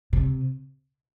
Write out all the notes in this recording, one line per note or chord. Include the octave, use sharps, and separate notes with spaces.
C3